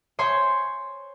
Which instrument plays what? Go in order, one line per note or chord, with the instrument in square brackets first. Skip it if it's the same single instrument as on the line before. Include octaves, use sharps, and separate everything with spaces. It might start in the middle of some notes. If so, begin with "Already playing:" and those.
[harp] C5 C#5 G#5 C6